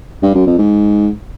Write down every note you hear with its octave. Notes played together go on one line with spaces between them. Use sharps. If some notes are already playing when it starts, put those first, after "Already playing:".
G2
F#2
F2
G#2